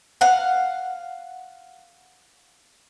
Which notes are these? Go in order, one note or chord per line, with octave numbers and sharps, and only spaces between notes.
F5 F#5